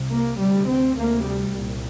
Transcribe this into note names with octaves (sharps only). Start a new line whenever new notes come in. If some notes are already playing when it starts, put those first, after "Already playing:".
Already playing: C2 C3
A#3
D2 C3 G3
C4
D2 C3 A#3
G3
C2 A#2